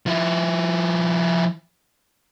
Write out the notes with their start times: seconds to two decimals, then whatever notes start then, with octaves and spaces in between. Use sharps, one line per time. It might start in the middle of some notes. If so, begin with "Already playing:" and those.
0.06 F3 E4